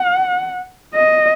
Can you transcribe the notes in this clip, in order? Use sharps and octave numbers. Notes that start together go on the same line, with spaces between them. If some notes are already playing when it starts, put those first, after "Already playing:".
Already playing: F#5
D#5